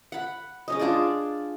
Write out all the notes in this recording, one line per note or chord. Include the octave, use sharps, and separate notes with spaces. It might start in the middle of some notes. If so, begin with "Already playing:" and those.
F#5 B5
G#3 C#4 D#5
D4 F4 G#4 D5